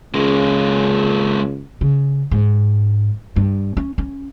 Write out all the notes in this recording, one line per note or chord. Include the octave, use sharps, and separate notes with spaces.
C#2 C#3 G#3 A#3
C#3
G#2
G2
C#4
C#4